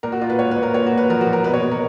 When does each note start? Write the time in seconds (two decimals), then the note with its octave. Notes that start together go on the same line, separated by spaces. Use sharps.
0.03 A#2 A#4
0.12 F#4
0.21 A#2 F4
0.30 B4
0.39 A#2 C#5
0.51 B4
0.56 A#2
0.63 A#4
0.74 A#2 C#5
0.86 F#4
0.91 A#2
0.97 B4
1.10 F3 A#4
1.21 F#4
1.27 A#2
1.33 A#4
1.44 B2 B4
1.53 C#5
1.62 B2
1.71 A#4